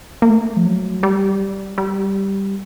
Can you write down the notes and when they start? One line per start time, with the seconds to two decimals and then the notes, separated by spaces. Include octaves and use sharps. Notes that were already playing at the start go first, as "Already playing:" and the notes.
0.22 A#3
0.29 A3
0.57 F3
0.66 F#3
1.03 G3
1.78 G3